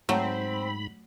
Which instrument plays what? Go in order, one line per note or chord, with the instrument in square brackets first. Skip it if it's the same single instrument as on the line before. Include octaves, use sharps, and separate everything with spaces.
[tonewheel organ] G#2 B5 [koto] F#3 A3 [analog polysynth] C4